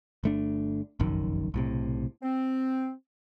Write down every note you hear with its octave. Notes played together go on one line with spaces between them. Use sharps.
G1 A3 D4
F1 A#1 F#2 D#3
B1 A2 C3
C4